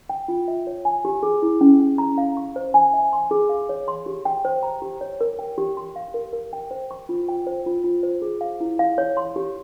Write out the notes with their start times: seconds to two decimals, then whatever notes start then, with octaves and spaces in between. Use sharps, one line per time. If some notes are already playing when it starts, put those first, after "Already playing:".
0.09 G5
0.28 F4
0.48 E5
0.67 C#5
0.85 G#5
1.05 G4
1.23 G#4
1.42 E4
1.61 C#4
1.80 C#4
1.98 A#5
2.18 F5
2.37 C#6
2.56 C5
2.74 G#5
2.93 E5
3.13 C6
3.31 G#4
3.49 F5
3.69 C#5
3.88 C6
4.06 G4
4.25 G5
4.45 C5
4.63 A#5
4.82 G4
5.01 C#5
5.21 A#4
5.39 G5
5.58 G4
5.77 C6
5.96 F5
6.14 A#4
6.33 A#4
6.53 G5
6.71 C5
6.91 C#6
7.09 F4
7.28 G5
7.47 C5
7.66 F4
7.84 F4
8.03 C5
8.22 G#4
8.41 F5
8.60 E4
8.79 F5
8.98 C#5
9.17 C6
9.36 G4